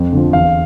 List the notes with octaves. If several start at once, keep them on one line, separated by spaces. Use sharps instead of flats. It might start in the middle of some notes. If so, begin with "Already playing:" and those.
Already playing: F2
D3 F3
E2 F5